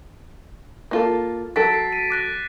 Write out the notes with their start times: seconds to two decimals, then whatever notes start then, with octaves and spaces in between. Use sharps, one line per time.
0.91 A#3 F4 A4
1.56 F#3 A4 A6 B6 D7
1.74 C7
1.93 D#7
2.10 D6 F#6 A#6